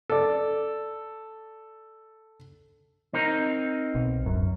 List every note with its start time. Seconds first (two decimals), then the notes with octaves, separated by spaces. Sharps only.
0.10 A4 D5
3.13 C4 D#4 A#4
3.95 B1
4.26 D1 F#2